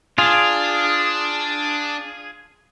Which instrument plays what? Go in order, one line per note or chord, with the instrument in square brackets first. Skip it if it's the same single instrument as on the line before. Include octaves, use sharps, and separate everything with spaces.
[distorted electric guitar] D4 [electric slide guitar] F4 [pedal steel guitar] G#4